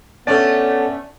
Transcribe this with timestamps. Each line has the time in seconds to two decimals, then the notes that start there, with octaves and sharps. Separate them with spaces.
0.27 A3 B3 C#4 A4 C#5 D5 A6